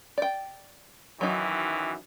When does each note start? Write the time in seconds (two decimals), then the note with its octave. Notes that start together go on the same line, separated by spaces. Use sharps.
0.18 D5 G5
1.21 F#2 D#3 E3 F#3 D#4